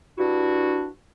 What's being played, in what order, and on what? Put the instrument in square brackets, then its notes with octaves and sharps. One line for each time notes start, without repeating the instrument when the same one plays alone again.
[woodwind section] G2 D4 E4 F#4